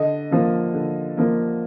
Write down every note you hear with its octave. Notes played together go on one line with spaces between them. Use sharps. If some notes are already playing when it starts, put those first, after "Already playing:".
Already playing: D3 D#5
F3 A#3
D3
F3 A#3